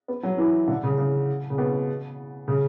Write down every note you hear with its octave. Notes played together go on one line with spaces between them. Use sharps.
B3
F#3
E3
D3
C#3
C#3
C#3
B2
C#3